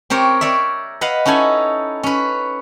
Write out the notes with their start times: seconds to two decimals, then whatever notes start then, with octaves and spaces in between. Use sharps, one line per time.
0.10 C4 G4 A#4 C#5
0.41 A#4 C#5 D5 E5
1.01 B4 D#5 F5 F#5
1.25 C#4 D#4 E4 A4 G#5
2.03 C#4 B4